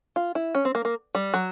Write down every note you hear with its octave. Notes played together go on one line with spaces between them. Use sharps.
F4
E4
C#4
C4
A#3
A#3
G3
F#3